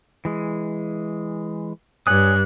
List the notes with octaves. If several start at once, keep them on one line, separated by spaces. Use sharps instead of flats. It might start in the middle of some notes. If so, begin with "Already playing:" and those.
E3 G#3
G2 C#5 G#5 D#6 F#6